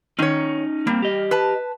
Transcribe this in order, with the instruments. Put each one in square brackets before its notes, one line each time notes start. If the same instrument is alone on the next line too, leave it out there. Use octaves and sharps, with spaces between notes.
[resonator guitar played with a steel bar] D#3 C#5 [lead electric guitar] C#4 D#4
[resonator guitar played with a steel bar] G3 [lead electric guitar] A#3 C4
[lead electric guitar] G4 D#5
[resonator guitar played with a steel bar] B4 A5